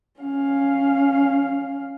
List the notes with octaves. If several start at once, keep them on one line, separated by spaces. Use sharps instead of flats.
C#4 F5